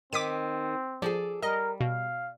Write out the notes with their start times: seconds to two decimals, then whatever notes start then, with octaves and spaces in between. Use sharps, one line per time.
0.13 D#3 C4 D6 B6 D#7
1.02 F3 G#4 A4 D5
1.42 G3 A#4 D#5
1.80 B2 F5